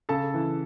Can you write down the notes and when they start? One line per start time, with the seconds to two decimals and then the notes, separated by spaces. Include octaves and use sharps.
0.09 C#3 A4 A5
0.34 E3